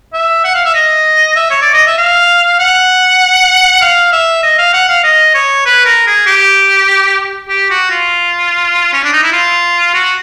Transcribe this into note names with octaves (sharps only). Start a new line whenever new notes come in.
E5
F#5
F5
E5
D#5
E5
C#5
D5
D#5
E5
F5
F#5
F5
E5
D#5
F5
F#5
F5
D#5
C#5
B4
A#4
G#4
G4
G4
F#4
F4
C#4
D4
D#4
E4
F4
F#4